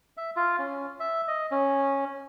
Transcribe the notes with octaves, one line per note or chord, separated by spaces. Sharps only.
E5
F4
C#4
E5
D#5
C#4